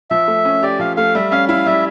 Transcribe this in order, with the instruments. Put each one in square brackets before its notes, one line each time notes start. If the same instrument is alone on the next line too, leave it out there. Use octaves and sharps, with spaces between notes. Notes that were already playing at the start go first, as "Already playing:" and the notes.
[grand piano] F3 [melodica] E5
[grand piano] A3
C#4
[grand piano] G4 [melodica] D5
[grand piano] F3 [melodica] F5
[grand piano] A3 [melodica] F5
[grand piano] G3 [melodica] E5
[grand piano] C#4 [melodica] F5
[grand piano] E4 [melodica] F5
[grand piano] G3 [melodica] E5